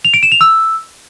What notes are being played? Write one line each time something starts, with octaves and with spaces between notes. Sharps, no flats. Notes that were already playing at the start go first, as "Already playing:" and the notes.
F7
D7
E7
F7
E6